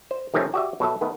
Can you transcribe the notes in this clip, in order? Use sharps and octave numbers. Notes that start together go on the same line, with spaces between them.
C5
C3 D#3 F3 A3 C4 C#4
F#4 G4 D5 E5
B2 F#3 A4 E5
D#3 A3 B3